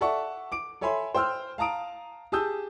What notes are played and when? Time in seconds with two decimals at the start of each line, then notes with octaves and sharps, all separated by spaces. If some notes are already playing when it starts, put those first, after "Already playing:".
0.01 A4 D5 E5 F#5 A5 C#6
0.52 D6 D7
0.81 A4 C#5 E5 G#5 B5 C6
1.14 C5 G5 C6 E6 F6
1.58 F5 A5 A#5 D#6 D7
2.32 G4 G#4 A5 D#6 E6 G6